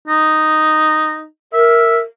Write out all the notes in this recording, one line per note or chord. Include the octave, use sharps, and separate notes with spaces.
D#4
A#4 E5